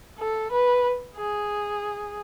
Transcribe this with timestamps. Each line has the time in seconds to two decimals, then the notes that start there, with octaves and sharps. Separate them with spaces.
0.19 A4
0.52 B4
1.17 G#4